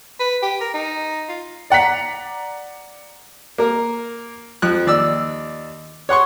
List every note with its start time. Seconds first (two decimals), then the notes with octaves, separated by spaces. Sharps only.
0.20 B4
0.43 G4
0.61 A#4
0.74 D#4
1.29 F4
1.70 D5 F#5 A#5 B6
3.58 A#3 A#4
4.62 F2 F3 F#6
4.87 D#2 D5 E6
6.09 C#5 F#5 C6 C#6